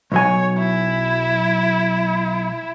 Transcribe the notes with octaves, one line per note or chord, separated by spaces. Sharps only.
B1 F#3 C#5 G#5
E4